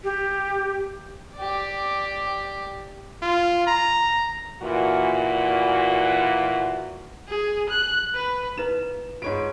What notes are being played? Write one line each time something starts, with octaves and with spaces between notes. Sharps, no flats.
G4
G4 D5
F4
A#5
A#2 E3 F#4
G#4
F#6
B4
D#4 E4 B4 E7
G#2 F4 C#5 D7